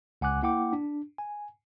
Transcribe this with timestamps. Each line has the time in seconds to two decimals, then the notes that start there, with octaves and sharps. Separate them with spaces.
0.21 C#2 F#5 G#5 D6 F#6
0.42 A#3 E4 F#5 G5 D6
0.73 D4
1.18 G#5